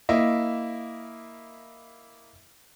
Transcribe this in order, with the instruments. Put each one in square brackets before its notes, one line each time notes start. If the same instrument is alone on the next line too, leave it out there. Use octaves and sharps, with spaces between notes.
[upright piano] A#3 E4 D#5 E5